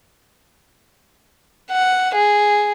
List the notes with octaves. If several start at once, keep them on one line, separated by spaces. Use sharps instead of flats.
F#5
G#4